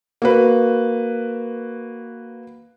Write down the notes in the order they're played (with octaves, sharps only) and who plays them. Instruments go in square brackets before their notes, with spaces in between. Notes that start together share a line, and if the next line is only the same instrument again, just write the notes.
[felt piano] A#3 F#4 B4